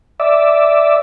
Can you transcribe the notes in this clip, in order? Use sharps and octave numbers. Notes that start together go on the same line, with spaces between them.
D5 E5